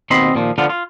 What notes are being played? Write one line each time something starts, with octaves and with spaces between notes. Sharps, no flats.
D#2 B2 C4 D#5 B5 C6
D#2 A#2 F3
D3 F3 B3 D4 F4
F4